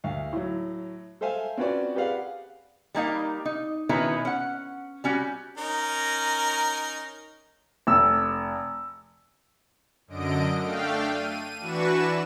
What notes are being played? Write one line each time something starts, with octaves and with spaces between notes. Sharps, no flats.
D2 F5
A2 F#3
A4 C5 E5 F5 G#5
C4 C#4 F4 F#4 B4 D5
G4 G#4 B4 D5 F5 F#5
G3 A#3 D#4 F5
D#4
B2 D#3 C#4 D#4 E4 B4
C#4 F#5
G3 C#4 F#4 G4
C#4 D#4 A#4
F1 E6
F#2 D3 D#5 D7
A3 D4 F5 G5
D#7
E3 D4 F#4 B4 C#6 E7